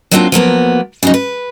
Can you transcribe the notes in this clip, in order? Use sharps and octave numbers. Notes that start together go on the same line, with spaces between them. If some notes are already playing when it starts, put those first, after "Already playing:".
F#3 G3 A#3 C4 D4 F4
F3 F#3 A#3 B3
C#3 F#3 D#4
B4